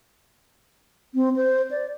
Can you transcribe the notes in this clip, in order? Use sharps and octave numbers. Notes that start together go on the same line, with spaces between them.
C4
C5
D5